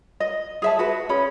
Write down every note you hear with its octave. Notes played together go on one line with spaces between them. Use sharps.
D#5
G#4 E5 A5
F#4 B4
C#4 G#4 B5